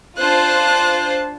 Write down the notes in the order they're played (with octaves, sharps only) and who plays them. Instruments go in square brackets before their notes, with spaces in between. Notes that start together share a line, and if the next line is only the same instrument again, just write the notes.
[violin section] D4 F4 C5 [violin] A5 F#6